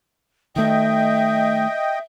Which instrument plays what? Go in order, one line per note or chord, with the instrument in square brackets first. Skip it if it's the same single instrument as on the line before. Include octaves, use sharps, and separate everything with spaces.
[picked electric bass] D#3 A3 [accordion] D#5 G5 [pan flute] E5